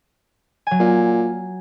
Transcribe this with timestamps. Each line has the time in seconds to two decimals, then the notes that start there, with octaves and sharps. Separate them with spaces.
0.67 F#3 G#5
0.80 A#2